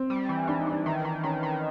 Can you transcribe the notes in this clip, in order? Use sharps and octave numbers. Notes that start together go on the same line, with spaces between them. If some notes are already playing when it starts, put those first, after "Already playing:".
Already playing: C4
G3
E3
E3 D4
D#4
E3 D4
D#3
D#3
D#3 C#4
D#3